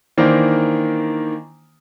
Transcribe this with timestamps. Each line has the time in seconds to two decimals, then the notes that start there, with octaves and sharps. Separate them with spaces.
0.17 D#3 E3 A#3 D4 C5